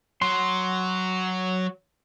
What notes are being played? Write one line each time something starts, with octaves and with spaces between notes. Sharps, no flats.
F#3 C6